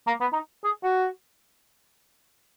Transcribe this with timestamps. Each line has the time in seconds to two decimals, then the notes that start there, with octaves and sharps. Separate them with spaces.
0.07 A#3
0.21 B3
0.33 D#4
0.64 G#4
0.83 F#4